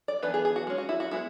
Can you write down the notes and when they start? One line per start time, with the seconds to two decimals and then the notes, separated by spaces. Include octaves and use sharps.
0.08 D5
0.23 E3 B3 D4 B4
0.34 G#4
0.45 G#4
0.56 F#4
0.67 G#3 C#4
0.78 F#4
0.89 E4
1.00 F#4
1.11 G#3 B3 E4